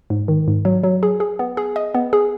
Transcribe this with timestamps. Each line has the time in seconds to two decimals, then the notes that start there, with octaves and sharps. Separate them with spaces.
0.10 G#2
0.28 D#3
0.48 G#2
0.65 F#3
0.83 F#3
1.03 G#4
1.20 G#4
1.39 B3
1.57 G#4
1.76 D#5
1.95 B3
2.13 G#4